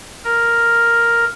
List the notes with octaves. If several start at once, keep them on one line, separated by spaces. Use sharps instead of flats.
A#4